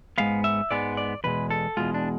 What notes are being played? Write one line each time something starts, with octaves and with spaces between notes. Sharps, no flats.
G#2 G#3 B3 F5
E5
G#2 G#3 B3 D5
D5
E2 B2 G#3 B4
A4
E2 B2 G#3 F4
D4